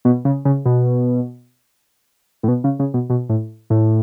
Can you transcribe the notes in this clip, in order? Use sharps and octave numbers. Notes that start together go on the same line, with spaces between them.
B2
C#3
C#3
B2
A2
B2
C#3
C#3
B2
B2
A2
A2